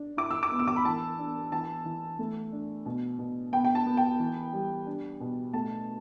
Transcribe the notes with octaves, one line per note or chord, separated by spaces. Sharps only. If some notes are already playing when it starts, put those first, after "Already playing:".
Already playing: D4
E4 D6
E6
D6
B3
E6
D6
B5
E3 A5
D4
E3 A5
E3
A3
D4
B2
B2
B3 G5
G5
A5
B3
G5
E3
G3
D4
B2
A3 A5